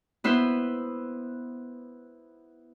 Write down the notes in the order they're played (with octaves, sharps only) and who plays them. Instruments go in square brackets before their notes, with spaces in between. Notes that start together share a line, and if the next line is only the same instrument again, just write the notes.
[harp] B3 E4 B4 C5